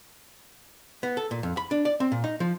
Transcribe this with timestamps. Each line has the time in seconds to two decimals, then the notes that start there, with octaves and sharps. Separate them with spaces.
1.03 B3
1.17 A4
1.31 A#2
1.43 F2
1.57 B5
1.71 D4
1.85 D5
2.00 C4
2.12 A#2
2.24 D#4
2.40 F3